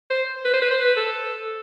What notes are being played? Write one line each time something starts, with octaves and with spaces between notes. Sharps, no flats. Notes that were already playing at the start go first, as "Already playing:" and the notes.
C5
B4
C5
B4
C5
B4
A4